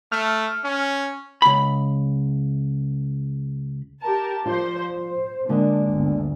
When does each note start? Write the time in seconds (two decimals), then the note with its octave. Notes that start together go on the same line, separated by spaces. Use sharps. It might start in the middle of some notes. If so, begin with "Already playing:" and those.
0.12 A3 F6
0.64 C#4
1.42 C#2 B5
4.03 G4 A#4 A5
4.46 F3 F4 C5 D5
4.93 C5
5.49 D3 G#3 A#3 D4
5.87 G1 D2